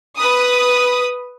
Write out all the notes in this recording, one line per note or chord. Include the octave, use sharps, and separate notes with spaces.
B4 D#6